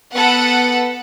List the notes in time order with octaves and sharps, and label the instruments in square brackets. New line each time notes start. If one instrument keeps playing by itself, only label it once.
[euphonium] B3 [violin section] A4 B4 F#5